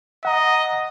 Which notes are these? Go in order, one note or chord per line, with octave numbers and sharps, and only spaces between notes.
D#5 F#5 A#5